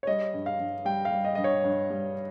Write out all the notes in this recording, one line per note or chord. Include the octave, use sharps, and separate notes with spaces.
C#5
G3 D#5
G2
F5
G2
G3 G5
F5
G3
D#5
G2 D#5
C#5
G2
G3